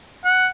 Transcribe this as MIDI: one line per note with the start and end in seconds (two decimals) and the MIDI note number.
0.25 0.47 78